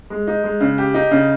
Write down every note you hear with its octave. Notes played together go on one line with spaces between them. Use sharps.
G#3
D#4
G#3
C#3
G4
D#4
C#3